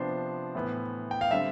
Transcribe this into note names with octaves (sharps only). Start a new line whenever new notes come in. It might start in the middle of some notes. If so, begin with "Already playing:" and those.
Already playing: C3 F3 B3 D4 C5
A2 E3 B3
G5
F5
D3 G3 C4 E5